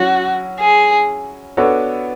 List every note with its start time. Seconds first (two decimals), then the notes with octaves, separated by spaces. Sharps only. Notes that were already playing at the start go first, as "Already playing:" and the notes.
Already playing: F#3 C#4 E4 F#4
0.60 G#4
1.57 B3 D4 F#4 A4 C#5